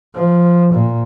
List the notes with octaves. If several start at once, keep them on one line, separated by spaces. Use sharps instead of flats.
F3
A#2